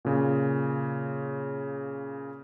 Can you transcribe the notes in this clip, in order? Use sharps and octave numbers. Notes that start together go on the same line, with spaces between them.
A#2 C#3